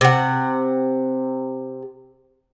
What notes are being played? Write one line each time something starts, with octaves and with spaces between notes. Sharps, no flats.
C3 F#5